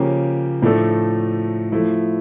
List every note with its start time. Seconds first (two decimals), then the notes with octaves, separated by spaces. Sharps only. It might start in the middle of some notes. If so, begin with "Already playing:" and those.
Already playing: C#3 F3 A#3 C#4 G4
0.62 A2 F3 A3 D4 A4
1.72 F3 A3 E4